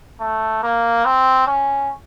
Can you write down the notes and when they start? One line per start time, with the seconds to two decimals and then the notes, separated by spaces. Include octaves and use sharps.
0.21 A3
0.63 A#3
1.05 C4
1.47 C#4